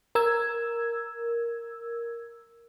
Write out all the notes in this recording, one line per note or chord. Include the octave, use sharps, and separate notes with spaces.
A#4 E6 G#6